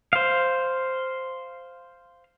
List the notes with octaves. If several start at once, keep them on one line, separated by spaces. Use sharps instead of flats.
C5 F5